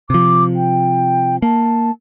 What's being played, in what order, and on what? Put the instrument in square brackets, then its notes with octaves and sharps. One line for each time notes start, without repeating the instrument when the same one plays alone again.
[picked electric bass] C3 F3 [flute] D6
[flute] G5
[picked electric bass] A#3 [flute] A5